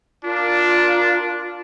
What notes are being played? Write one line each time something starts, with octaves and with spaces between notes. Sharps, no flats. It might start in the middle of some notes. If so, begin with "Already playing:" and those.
D4 F4 A#4